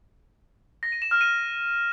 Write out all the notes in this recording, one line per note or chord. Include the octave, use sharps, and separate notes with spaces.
A#6
D#7
E7
F6
D#7